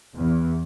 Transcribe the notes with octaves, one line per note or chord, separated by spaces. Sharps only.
E2